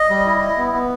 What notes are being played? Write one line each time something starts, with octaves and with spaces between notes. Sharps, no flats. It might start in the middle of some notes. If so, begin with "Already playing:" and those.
Already playing: D#5
G3
E4
E4
B3
B3